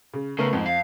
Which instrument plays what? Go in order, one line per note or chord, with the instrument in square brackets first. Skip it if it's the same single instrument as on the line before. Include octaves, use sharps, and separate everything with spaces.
[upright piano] C#3
[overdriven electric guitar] C#2 C#3 [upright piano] A3 B3 A#4
[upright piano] F2 [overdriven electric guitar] G#2
[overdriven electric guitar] F5